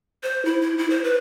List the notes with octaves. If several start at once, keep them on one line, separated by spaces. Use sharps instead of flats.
C5
E4
E4
E4
C5
B4